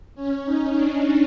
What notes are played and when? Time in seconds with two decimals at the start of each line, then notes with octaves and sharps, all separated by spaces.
0.15 C#4
0.45 D#4
0.74 D4